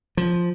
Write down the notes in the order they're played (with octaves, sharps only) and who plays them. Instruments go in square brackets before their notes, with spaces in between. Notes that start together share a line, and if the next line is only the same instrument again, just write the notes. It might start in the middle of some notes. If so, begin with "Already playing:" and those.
[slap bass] F3